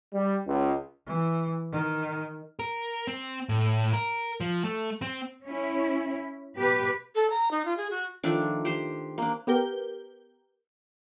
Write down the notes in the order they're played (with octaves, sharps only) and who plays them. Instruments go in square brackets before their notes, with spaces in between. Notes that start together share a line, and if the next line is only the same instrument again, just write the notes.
[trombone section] G3
C#2
[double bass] E3
D#3
[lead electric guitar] A#4
C4
A2
A#4
F3
A3
C4
[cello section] C#4 E4
B2 G4 B4
[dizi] A4
A#5
D#4
F4
G#4
F#4
[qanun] D#3 F3 A3 D4
G4 C5 G5 C6
A#3 D4
[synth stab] B3 G4 A#4 G6